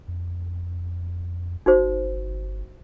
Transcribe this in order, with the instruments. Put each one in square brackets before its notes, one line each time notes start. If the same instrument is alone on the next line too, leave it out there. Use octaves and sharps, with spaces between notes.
[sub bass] F2
[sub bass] G1 [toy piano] D#4 F#4 C5